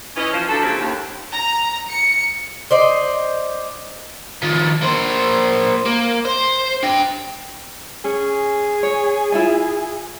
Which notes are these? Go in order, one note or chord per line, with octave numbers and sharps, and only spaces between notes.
E3 C#4 D#5
F3
D3 F#3 D4 A4
A#2 C#3 G#3 C4 E4 G4
D#2
A#5
C#7
C5 D5 D#5
D#3 F3
A#3 C5
A#3
C5
D4 G5
C#4 G#4
C#5
E4 F4 G#5